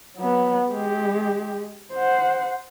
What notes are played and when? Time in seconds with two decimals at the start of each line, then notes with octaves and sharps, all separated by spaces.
0.17 F#3 B3
0.69 G#3 G4
1.93 C5 F#5